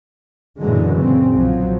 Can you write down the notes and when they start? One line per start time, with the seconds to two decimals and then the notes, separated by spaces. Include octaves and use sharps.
0.59 F#2 A#2 D3 E3 F#3 G#3
0.96 C#3 C4
1.33 B1 F3 F#3